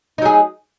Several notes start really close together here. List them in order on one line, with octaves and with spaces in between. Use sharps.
D#4 F#3 G#4